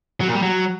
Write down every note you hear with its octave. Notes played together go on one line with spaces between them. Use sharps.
F#3
A#2
G3
F#3